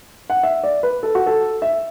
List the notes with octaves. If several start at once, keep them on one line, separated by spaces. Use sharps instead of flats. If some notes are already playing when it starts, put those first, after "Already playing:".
F#5
E5
D5
B4
A4
F#4
A4
E5